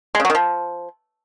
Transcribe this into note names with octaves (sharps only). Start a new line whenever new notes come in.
G#3
C#3
F#3
D#3
F3